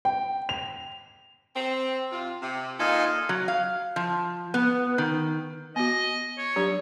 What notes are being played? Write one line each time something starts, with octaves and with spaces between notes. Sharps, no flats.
G5
F7
C4
C3 F4
C3
A#2 D#4 F4 A4 G#5
F#3
F5
F3
B3
D#3
B3 F#4 D#5
C#5
F#3 D4 G4